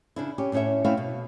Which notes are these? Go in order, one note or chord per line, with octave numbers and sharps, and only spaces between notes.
C#3 D4 E4
C#4 G4
A2 C#4 D4 C#5 E5
A3 C4 C#4 E4 E5 F5
B2